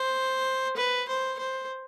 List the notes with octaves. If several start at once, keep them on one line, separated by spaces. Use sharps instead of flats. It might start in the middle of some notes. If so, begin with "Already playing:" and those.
Already playing: C5
B4
C5
C5